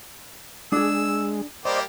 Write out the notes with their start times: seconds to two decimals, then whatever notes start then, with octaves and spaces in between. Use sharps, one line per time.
0.72 G#3 D4 G#4 E6
1.65 G3 A#3 G4 C5 D5 D#5